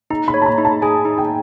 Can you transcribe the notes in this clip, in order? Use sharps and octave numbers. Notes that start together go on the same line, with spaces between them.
D#4 A#5
B5
C#5
A5
A#5
D#4
A5
G#4 G#5
D#4
G5